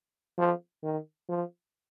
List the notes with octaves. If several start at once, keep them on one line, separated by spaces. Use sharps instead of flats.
F3
D#3
F3